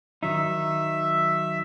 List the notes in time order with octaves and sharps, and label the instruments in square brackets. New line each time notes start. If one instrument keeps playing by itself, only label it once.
[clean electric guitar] D#3 F#3 D#4 [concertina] E5